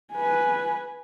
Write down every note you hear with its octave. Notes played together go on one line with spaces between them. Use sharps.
B4 G#5